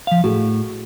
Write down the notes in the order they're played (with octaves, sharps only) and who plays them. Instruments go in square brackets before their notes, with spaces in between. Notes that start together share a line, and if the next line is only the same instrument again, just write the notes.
[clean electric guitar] F3 F5
[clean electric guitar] A2 [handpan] F#4 G#4 A4